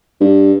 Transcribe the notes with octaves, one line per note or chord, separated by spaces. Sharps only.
G2